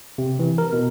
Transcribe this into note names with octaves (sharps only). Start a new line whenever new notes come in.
C3
E3
A#4
B2